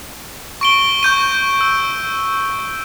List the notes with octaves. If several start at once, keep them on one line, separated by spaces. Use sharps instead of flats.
C#6 D7 G7
C#6 G6 D#7
E6